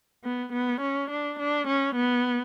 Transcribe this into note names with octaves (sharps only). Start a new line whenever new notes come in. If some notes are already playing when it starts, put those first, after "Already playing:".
B3
B3
C#4
D4
D4
C#4
B3